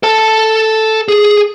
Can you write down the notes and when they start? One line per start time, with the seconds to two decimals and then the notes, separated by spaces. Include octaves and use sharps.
0.03 A4 A5
1.08 G#4